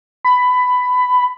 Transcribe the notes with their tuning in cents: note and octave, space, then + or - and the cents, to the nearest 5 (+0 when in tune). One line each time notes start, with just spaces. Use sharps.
B5 +15